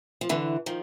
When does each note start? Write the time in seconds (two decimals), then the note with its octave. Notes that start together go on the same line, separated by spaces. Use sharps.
0.21 F3
0.29 D3 E3
0.66 D#3 F3